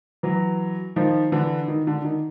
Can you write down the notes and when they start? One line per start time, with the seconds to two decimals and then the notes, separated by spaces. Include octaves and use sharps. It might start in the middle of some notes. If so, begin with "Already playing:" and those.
0.23 E3 F#3
0.96 D#3 F3
1.32 D3 E3
1.68 D#3
1.87 D3
2.04 D#3